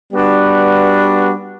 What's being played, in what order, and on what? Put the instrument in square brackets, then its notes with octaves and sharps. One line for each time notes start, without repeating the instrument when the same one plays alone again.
[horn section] G3 B3 D4 F#4 B4